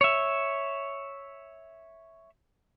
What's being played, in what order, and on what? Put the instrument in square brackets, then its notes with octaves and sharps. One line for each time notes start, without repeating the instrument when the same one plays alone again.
[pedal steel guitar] C#5 E5